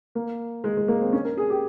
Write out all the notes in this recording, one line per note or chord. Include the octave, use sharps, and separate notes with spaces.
A#3
G#3
G#3
A#3
C4
C#4
A#4
G#4
G4